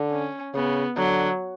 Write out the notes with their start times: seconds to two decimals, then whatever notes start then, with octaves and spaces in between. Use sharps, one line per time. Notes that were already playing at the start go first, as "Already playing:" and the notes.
Already playing: D3
0.11 C#4
0.54 C#3 B3
0.97 D3 F#3